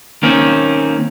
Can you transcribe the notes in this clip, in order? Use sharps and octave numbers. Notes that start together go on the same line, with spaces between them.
D#3 A#3 C4 C#4